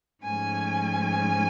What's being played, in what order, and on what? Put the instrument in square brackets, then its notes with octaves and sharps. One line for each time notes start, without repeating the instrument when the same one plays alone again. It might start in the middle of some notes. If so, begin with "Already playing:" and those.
[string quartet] G#2 F3 A3 C#4 G#5